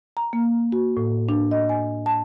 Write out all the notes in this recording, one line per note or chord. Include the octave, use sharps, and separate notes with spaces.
A#5
A#3
F#4
A2
D4
D#5
G#5
A5